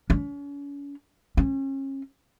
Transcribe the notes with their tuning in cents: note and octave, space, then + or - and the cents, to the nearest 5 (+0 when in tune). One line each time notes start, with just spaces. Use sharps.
C#4 +40
C#4 -35